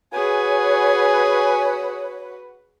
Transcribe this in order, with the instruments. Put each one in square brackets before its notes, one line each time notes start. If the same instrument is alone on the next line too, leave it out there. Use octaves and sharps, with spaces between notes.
[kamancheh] F#4 B4 [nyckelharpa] G#4 [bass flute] C#5 [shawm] G#5